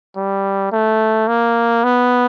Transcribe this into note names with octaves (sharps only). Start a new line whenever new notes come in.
G3
A3
A#3
B3